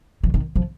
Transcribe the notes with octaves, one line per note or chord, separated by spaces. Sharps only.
E3
D#3
F3